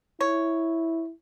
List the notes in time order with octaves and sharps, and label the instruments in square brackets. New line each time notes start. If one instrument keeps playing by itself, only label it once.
[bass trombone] E4 [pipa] C#5